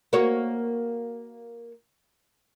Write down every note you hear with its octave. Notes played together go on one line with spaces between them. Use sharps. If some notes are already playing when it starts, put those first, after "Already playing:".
A#3 F#4 C#5